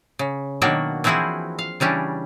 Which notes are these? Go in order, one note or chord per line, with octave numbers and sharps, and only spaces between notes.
C#3
B2 D#3 F#3 A#3 D4 F#4
E3 F3 C4 E4 F#4 G#4
F5
C#3 E3 G3 C#4 D4